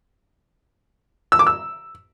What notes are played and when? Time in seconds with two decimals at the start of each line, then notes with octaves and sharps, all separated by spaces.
1.32 E6
1.39 D6
1.47 E6